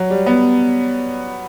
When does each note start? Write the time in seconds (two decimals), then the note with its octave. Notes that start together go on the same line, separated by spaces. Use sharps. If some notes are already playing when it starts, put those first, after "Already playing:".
Already playing: F#3
0.10 G3
0.26 B3